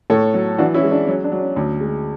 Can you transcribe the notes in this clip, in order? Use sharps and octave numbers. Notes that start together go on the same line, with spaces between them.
A2 A4 C#5
F#3
E3 D4 F#4
C#4 E4
G#3
D4
F#3 C#4
D4
F#3
C#4
D2
G#3